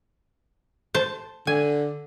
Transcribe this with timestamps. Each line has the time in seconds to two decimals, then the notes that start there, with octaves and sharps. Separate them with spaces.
0.95 C5 A5
1.47 D3 G#5